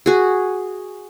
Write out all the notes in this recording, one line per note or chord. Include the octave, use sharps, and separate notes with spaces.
F#4 G#4